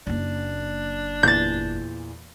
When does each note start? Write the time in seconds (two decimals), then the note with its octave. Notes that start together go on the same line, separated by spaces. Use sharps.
0.07 F#1 A#3 D4
1.23 E2 A#2 E3 G6 A6